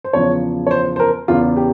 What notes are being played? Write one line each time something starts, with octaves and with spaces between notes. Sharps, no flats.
C5
E2 C#3 F3 C#5
C#5
C5
C5
A#4
E2 C#3 E3 F4
G4